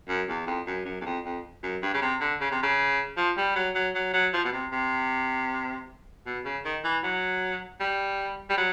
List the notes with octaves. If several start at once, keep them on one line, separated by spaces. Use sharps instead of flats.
F#2
E2
F2
F#2
F#2
E2
F2
F2
F#2
G2
C#3
C3
D3
C#3
C3
C#3
F3
G3
F#3
F#3
F#3
F#3
F3
B2
C3
C3
B2
C#3
D#3
E3
F#3
G3
G3
F#3